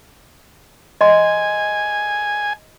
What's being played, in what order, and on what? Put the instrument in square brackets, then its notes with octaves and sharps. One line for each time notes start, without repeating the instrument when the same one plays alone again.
[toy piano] D#5 C6 [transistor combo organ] G#5